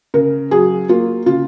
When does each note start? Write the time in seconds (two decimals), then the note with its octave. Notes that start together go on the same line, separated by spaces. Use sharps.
0.14 C#3 A#4
0.51 F#3 G#4
0.89 A#3 F4
1.26 C#3 F4